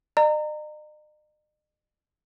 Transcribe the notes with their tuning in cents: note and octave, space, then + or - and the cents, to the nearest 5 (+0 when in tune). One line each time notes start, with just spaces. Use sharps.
D#5 -45 A#5 -20